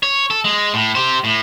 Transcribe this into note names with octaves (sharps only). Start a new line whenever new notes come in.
C#5
A4
G#3
A2
G4 C5
A2